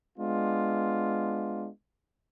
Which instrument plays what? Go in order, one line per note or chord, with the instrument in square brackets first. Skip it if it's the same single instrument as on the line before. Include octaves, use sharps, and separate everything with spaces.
[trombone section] G#3 B3 D4 F4